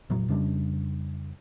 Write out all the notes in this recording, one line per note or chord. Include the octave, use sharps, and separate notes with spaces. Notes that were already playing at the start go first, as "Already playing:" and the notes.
F1 A#2 F#3
F2 C#3 G3 D4